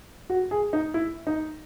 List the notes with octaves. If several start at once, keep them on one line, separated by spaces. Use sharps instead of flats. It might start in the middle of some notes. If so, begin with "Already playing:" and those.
F#4
G#4
D#4
E4
D#4